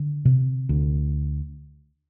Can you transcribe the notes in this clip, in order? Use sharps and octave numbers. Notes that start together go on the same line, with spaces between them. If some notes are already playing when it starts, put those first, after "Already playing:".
Already playing: D3
C3
D2